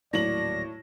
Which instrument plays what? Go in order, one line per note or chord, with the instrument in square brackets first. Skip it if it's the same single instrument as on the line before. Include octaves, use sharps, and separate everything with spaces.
[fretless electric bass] D#1 F#3 A#3 [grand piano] A2 F#7 [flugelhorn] D5 [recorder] A#6